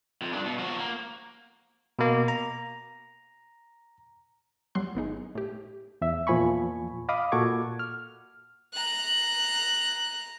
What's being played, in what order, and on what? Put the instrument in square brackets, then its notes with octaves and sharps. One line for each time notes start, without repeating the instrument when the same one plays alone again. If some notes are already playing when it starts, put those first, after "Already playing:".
[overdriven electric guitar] F2
G2 D4
B2
F3 F#4
A#3
[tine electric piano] B2 A#3
A#5
[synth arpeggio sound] E2 F#3 G3 C6 F#6
G#1 B3 D#4 G#4
A2 G4
[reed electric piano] E2 E5
E2 A#2 F3 G#5 B5 C#6
D#5 F5 B5 D6 D#6
A#2 F#4 A4 C#6 D6 G#6
F6
[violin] A#5 F#6